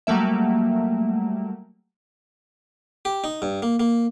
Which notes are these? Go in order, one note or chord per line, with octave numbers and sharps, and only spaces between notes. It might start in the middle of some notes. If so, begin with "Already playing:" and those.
F#3 G3 A3 A#3 E5
G4
D#4
G2
A#3
A#3